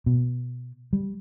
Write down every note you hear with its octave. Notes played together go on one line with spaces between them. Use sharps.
B2
G3